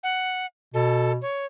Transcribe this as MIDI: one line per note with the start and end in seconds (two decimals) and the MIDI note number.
0.03 0.46 78
0.74 1.19 47
0.74 1.12 69
1.22 1.46 73